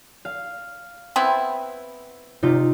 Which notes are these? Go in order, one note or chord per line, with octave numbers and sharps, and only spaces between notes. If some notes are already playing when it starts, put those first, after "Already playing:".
F5
B3 C4 E4
C3 D#4 F4